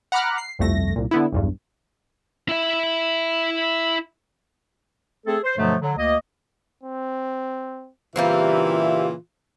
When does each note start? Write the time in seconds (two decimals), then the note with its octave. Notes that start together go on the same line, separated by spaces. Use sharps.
0.12 F#5 A#5 B5 D6 F6 F#6
0.38 C7
0.59 G1 C2 F2 A3 A#6
0.96 C2 A#2
1.11 D3 B3 E4
1.32 B1 E2 G2
2.49 E4 E5
5.27 A3 C4 G#4 A4
5.44 C5
5.58 G2 B2 D3 F3 F#3 A3
5.81 D3 F#3
5.98 D2 A#3 D#5
6.83 C4
8.16 A#2 C#3 E3 G3 A#3 C4 F4 E5